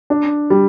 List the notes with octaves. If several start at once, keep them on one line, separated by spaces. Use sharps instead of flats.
D4
G3